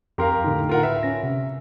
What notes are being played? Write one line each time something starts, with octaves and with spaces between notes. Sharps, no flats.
F2 G4 A#4 F5 A#5 C6
A2 D3 D#4
F4 A#4 F#5
B4 E5
C#4 A#6
C3